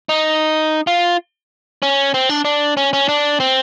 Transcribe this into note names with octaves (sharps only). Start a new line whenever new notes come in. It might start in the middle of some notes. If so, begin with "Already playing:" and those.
D#4
F4
C#4
C4
D4
D4
C#4
C#4
D4
C4